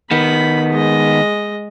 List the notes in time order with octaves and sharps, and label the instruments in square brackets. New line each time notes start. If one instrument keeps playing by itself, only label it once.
[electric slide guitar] D#3 B3 [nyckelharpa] B5
[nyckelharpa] G#3 D#5